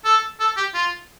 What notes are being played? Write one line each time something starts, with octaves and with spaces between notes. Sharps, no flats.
A4
A4
G4
F4